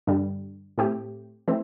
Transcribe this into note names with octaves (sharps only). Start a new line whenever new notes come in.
G2 D3 G3
A2 A3 C4 G4
E3 A3 C4